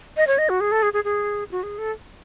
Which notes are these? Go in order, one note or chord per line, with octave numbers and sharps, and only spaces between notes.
D#5
C#5
D#5
F#4
G#4
A4
G#4
G#4
G#4
F#4
G#4
A4